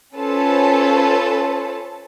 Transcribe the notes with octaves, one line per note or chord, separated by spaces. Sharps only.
C#4 F4 A4 B4 C5 A5